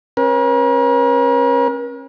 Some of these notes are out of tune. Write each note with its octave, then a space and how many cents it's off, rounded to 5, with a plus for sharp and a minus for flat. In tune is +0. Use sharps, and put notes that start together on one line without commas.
C#4 -40 A#4 +45